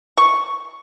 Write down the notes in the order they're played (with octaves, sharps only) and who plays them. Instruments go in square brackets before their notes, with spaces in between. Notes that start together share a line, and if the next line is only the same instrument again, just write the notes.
[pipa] C#6